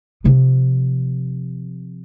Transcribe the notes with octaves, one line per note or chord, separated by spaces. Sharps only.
C3 F3